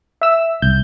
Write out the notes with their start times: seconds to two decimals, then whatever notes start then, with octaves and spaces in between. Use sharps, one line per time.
0.21 E5 E6
0.62 C2 G6